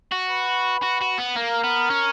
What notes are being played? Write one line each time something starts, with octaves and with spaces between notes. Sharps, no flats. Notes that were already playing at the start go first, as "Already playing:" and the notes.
F#4
B4
F#4
F#4
B3
A#3 A#4
B3
C#4